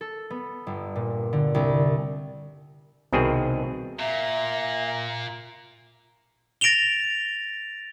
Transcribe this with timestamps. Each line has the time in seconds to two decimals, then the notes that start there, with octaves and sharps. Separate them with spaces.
0.01 A4
0.30 B3
0.67 G1
0.96 A#2
1.33 D3
1.55 C2
3.13 C2 B2 D#3 C4 G#4
3.99 A#2 E5 F5 A#5
6.61 A6 A#6 D7 E7 F7 G7